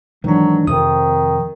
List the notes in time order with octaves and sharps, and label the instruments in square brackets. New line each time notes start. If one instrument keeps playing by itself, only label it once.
[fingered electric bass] G#2 D#3 [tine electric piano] E3 D4 [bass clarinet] F#3
[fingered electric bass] F2 C3 F3 [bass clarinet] D#3 [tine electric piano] D#6